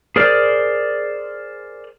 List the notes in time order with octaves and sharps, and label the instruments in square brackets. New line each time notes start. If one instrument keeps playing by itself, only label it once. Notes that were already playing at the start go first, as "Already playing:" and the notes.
[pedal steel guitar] G#4 A#4 C5 D5 F6